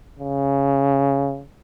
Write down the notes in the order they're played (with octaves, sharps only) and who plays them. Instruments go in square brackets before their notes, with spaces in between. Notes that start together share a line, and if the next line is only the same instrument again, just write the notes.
[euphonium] C#3